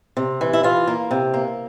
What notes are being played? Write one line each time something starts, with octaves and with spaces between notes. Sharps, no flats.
C3
E3
E4
E3 F4
A#3
C3
A#3